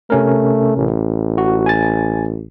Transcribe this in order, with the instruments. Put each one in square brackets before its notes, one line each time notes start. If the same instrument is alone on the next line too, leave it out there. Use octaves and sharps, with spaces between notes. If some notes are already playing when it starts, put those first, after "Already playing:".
[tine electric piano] C3 C#4 A#4 [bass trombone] A3
[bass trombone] A1
[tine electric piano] F#4
G#5 A6